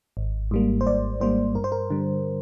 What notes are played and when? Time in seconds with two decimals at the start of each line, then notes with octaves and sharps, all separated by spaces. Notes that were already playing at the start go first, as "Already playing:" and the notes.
0.17 G#1
0.51 G#2 G3 A#3
0.81 C5
0.86 G#1 D5
1.21 G#2 G3 A#3 C5
1.55 G2 A#4
1.64 C5
1.72 A#4
1.90 D3 G3